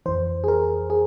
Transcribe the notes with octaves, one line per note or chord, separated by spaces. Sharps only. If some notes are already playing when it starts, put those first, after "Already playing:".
F2 E3 C5
G#4
A#4
G#4